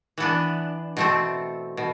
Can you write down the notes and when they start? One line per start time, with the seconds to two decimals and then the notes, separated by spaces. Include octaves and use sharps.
0.18 E3 B3 D4
0.97 B2 A3 C4
1.77 B2